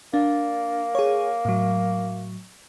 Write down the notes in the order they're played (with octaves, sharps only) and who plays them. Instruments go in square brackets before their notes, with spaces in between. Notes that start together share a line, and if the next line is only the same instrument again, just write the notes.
[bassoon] A#3 [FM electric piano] D4
[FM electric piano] G#4 C#5
A2 F#3